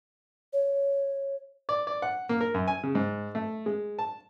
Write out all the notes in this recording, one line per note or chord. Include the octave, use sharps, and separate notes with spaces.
C#5
D5
D5
F#5
A#3
A#4
F#2
G#5
C#3
G#2
A3
G#3
A5